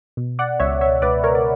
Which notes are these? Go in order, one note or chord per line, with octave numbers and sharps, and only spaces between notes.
B2
D5 F#5
C#2 C#5 E5
C#5 E5
C#2 B4 D5
A#4 C#5
D5